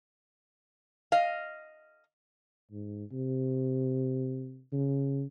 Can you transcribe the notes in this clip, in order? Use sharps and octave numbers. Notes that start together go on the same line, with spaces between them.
D#5 F5
G#2
C3
C#3